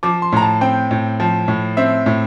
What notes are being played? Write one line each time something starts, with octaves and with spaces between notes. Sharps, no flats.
F3 D6
C6
A2 A#5
A5
C4 G5
A2
F3
A2
C4 E5
A2